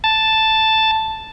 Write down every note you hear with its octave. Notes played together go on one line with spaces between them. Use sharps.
A5